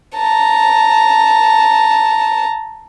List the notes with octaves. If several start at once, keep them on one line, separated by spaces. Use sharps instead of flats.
A5 A#5